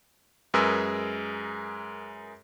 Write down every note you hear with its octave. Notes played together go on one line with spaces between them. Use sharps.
F#2 G#3 G#4 A#4 B4 E6